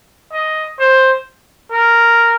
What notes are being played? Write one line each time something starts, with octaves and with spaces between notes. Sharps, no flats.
D#5
C5
A#4